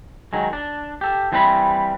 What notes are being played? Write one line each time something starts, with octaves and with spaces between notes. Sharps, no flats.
D#3 F#3 G#3
D4
G4 A4
E3 G3 C4 B4 F5 B5